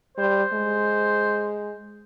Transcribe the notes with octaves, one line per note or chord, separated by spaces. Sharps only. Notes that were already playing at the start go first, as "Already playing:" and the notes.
G3 C5
G#3